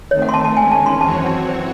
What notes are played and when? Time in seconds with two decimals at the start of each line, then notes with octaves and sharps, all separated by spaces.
0.11 D#3 A3 C4 C#5
0.22 F#5
0.29 C6
0.34 A5
0.45 A5
0.56 E2 D#3 G#3 C#4 G#5
0.71 A5
0.86 C6
1.01 F#2 E3 C4 F#4 C#5 A5